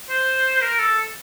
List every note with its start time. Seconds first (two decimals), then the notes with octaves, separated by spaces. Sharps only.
0.09 C5
0.61 A#4
0.79 A4